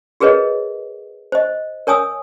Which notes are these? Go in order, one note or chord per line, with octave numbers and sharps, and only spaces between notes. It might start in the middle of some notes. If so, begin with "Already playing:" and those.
F#4 G#4 A#4 B4 C#5 D#5
C5 D#5
A#4 C#5 G#5 D#6 E6